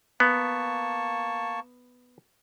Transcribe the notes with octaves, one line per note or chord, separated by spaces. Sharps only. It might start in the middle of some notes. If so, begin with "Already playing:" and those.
A#3 B3 A5 C#6